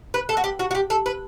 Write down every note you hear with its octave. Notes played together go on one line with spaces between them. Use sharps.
B4
A4
F#4
G4
F#4
F#4
G4
A4
B4